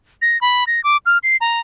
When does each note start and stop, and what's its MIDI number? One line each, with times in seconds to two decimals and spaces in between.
0.22 0.40 94
0.41 0.64 83
0.67 0.83 94
0.84 0.97 86
1.06 1.18 89
1.23 1.37 96
1.41 1.60 82